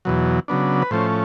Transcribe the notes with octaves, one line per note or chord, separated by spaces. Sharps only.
E2 B2 F#3
C#3 F#3 B3 D4
B4
A2 F3 A3 C#4 C5